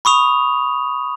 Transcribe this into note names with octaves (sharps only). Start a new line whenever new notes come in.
B5 C#6 D#6 F7